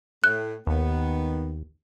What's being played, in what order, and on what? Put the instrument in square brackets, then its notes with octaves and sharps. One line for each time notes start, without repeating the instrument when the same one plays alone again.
[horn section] A2 [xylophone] F#6
[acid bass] D#2 [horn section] D#3 B3